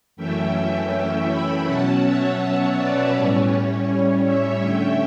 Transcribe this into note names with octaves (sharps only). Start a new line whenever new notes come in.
F#2 E3 A3 C#4 E5 G5
G5 B5
B2 F#3 C#4 F#5 A5
C#5 E5
C#5 E5
B4 D5
A2 G3 C#4 C#5
C#5 E5
D3 A3 C#4 E5 G5